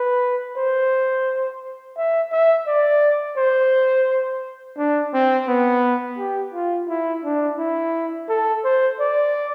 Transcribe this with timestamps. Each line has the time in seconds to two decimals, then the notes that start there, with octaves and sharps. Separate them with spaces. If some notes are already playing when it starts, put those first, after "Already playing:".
Already playing: B4
0.57 C5
1.97 E5
2.32 E5
2.67 D5
3.37 C5
4.78 D4
5.14 C4
5.47 B3
6.18 G4
6.54 F4
6.89 E4
7.24 D4
7.58 E4
8.29 A4
8.64 C5
9.00 D5